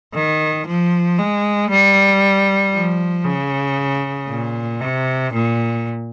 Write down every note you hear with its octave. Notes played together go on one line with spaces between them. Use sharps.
D#3
F3
G#3
G3
F3
C#3
A#2
C3
A#2